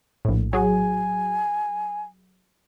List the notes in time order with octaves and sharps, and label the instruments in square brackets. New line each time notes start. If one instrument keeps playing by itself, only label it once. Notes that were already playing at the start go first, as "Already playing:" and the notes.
[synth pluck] A#1 A2
[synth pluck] F#3 F#4 G#4 [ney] G#5